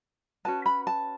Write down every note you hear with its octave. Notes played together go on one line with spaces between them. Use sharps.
C#4 F#4 B4 A5
B5
A5